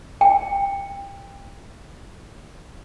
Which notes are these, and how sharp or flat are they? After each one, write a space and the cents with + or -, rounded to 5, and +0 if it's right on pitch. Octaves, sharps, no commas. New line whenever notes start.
G5 +20